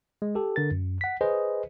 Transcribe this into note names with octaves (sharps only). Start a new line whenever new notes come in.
G#3
G4 A4
D3 A#4 A6
F#2
F#5 B6
G#4 B4 C5 D#5